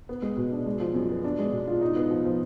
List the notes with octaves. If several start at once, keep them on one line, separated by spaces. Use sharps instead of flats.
B3
G#3
B2
D4
G#3
F3
F#2
B3
D4
G#3
B2
F4
D#4
B3
F3
F3